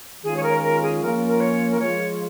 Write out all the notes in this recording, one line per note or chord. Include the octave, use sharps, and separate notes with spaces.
D#3 G#3 C#4 F4 G#4
C#5
A#4
A#4
G#4
F3 A#3 C#4 F4 A#4
A#4
C#5
A#4
F3 G#3 F4 C#5